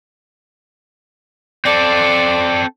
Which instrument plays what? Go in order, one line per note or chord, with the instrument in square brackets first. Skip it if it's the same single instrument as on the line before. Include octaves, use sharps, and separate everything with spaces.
[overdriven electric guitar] C4 A4 [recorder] D5